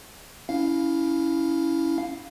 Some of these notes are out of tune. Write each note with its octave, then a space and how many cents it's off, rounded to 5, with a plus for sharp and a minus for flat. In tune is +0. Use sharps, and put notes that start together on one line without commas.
C#4 +25 E4 -5 F5 +0